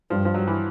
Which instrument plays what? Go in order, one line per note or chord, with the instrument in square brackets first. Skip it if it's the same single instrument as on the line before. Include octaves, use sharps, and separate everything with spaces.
[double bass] G2 [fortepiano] F3
[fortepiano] F3
F#3
E3